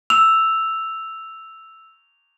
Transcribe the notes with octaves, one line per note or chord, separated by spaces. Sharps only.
E6 F7